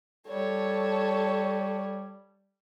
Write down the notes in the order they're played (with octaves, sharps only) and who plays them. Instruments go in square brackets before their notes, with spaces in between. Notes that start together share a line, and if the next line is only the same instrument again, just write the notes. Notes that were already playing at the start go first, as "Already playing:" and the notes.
[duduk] G3 [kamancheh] A4 C#5